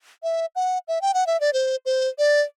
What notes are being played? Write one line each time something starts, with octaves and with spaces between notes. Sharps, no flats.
E5
F#5
E5
G5
F#5
E5
D5
C5
C5
D5